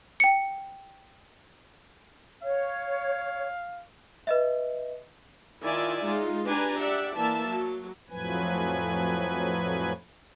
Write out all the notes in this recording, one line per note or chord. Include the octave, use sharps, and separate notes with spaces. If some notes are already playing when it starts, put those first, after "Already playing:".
G5 C#7
C#5 F5
B4 D#5 E5
D#3 E4 F4 D5 E5 G#5
G#3 D#4 F4
D4 G4 B4 D5 G#5 A#5
G4 D5 E5 F#5
E3 A#3 E5 A5
F#3
F2 A2 F3 F#3 B4 G#5